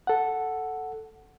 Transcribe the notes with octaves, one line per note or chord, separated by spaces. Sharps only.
A4 F#5